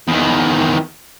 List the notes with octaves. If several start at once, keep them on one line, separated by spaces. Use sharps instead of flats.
E2 D#3